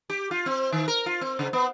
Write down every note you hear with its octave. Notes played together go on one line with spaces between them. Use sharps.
G4
F4
C4
D#3
A#4
F4
C4
C#3
B3